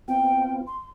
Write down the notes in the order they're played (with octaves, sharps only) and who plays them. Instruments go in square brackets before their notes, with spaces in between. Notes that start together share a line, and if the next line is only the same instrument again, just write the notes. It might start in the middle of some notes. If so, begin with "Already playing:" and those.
[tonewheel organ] B3 C4 F4 [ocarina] G5
[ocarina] C6